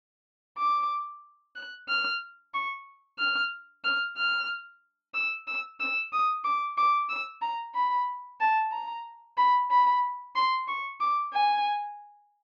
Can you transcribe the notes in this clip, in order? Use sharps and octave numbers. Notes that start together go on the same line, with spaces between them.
D6
F#6
F6
C#6
F6
F6
F6
E6
E6
E6
D#6
D6
D6
E6
A#5
B5
A5
A#5
B5
B5
C6
C#6
D6
G#5